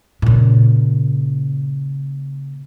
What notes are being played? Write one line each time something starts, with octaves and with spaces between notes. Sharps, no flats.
A#2 C#3